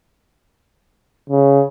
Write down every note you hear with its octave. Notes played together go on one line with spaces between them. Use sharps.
C#3